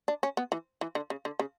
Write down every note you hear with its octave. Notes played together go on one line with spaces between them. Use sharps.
D4
C#4
B3
E3
E3
D3
C#3
D3
C#3